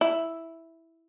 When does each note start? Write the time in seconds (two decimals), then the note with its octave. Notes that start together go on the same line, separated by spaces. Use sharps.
0.01 E4